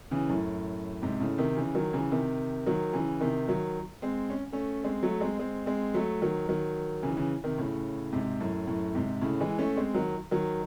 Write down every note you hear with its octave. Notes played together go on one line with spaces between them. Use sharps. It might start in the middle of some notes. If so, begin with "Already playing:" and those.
C#3 E3
F#2 A2
G#2 C3
A2 C#3
C3 D#3
C#3 E3
D#3 F#3
C#3 E3
C3 D#3
D#3 F#3
C#3 E3
C3 D#3
D#3 F#3
G#3 C4
C#4
A3 C#4
G#3 C4
F#3 A3
G#3 C4
G#3 C4
G#3 C4
F#3 A3
D#3 F#3
D#3 F#3
C#3 E3
C#3 E3
C3 D#3
A2 C#3
G#2 C3
F#2 A2
F#2 A2
G#2 C3
A2 C#3
E3 G#3
A3 C#4
G#3 C4
D#3 F#3
D#3 F#3